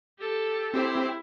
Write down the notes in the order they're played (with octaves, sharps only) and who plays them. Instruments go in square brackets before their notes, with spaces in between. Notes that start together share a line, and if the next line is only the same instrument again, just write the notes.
[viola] G4 A4
[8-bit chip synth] C4 G4 C5 [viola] E4